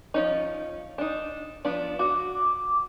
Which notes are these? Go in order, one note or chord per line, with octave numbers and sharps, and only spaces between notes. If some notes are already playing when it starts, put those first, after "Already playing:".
F3 C#4 D#4
D4 D#4
F3 B3 D4
F#4 D6